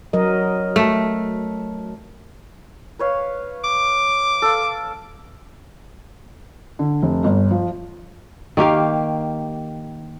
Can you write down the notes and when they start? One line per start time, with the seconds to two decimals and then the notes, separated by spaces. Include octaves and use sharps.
0.13 F#3 A#4 D#5
0.76 A3
2.99 B4 C#5 F5
3.64 D6
4.42 A4 F5
6.79 D3
7.02 F1
7.24 G1
7.51 F3
8.57 D#3 A#3 G4 F5